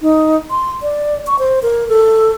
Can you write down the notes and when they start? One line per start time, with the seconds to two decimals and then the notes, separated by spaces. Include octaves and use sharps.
0.01 D#4
0.50 C6
0.82 D5
1.27 C#6
1.39 C5
1.63 A#4
1.89 A4